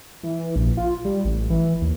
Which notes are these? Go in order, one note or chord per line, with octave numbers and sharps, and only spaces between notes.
E3
A#1
F4
G3
A1
E3
D#2